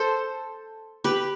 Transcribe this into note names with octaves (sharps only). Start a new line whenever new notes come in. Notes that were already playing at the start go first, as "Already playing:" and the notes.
Already playing: A4 C5
G4 B4